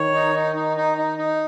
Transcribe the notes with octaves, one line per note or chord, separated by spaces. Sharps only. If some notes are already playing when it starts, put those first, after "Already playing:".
Already playing: D#3 C#5
D#4
D#4
D#4
D#4
D#4
D#4